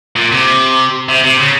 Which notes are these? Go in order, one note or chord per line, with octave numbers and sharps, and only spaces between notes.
A#2
C3
C3
C3
C#3